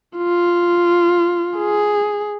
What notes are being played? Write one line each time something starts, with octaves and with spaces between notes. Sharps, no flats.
F4
G#4